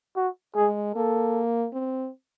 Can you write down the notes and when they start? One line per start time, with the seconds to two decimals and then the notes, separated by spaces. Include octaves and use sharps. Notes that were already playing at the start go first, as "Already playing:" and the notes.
0.16 F#4
0.55 G#3 G#4
0.95 A#3 A4
1.73 C4